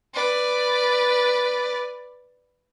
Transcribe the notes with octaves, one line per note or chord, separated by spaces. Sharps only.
B4 D5